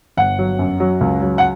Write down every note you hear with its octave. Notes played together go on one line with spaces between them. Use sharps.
G1 F#5
F#3
F#2
F#3
C#2
F#3
F#5